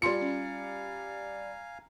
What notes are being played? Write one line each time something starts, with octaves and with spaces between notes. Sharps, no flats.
G3 F4 F5 G#5 A#5 C6 C#7
C#4